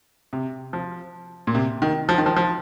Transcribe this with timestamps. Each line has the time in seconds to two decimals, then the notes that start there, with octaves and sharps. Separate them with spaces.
0.33 C3
0.73 F3
1.47 A#2
1.55 C3
1.82 D#3
2.09 F3
2.18 D#3
2.26 F3
2.36 F3